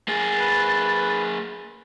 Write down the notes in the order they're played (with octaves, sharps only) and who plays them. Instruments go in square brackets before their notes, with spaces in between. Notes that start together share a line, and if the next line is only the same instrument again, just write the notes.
[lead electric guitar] A#3 G#4 [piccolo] A6
[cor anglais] B4